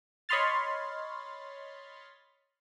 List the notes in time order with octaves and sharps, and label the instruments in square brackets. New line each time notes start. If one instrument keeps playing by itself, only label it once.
[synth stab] C#5 D#5 B5 C6 F6 A6